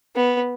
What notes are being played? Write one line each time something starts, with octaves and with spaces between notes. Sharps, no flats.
B3